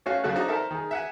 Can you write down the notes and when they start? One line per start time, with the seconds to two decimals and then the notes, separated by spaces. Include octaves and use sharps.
0.06 A3 C#4 F#4 F5
0.23 C#3 F#3 A3 F#4 A4 F#6
0.35 C4 D4 D#4 F#4
0.48 A4 A#4 C5 E5
0.71 D#3 G#4
0.91 E5 F#5 G#5